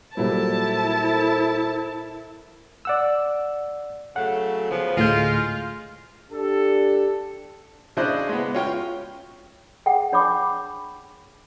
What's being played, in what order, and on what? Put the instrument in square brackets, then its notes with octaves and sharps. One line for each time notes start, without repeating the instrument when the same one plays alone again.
[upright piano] A#2 F#3 G3 [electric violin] E4 [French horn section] A4 A#4 C5 [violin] A5
[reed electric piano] D5 F#5 E6
[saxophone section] C#3 F#3 A3 [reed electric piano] F#5
[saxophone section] C#3 F3 B3
[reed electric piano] D2 A2 G6 [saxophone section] G#3 F4
[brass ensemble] D4 G4 A4
[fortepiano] C#3 D4 E4 C5 D#5 F#6
G#3 B3
C#4 F4 G5 F6
[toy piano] G#4 F#5 G5
D4 C#5 B5 C#6 D6